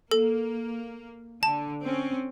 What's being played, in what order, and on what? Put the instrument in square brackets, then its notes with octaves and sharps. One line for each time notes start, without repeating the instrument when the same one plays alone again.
[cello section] A#3 [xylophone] A4
[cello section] D3 [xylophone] A5
[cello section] C4 C#4